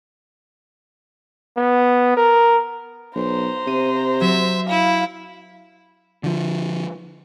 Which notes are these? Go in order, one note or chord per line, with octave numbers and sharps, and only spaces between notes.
B3
A#4
B1 C5 A#5
C3 D#7
F#3 E5
E4 F5
D3 F3